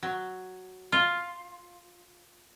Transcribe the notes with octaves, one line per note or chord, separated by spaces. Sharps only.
F#3
F4